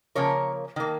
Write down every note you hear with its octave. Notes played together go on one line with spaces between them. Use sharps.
C#3 F3 A#3 A#4 C#5
D#3 A#3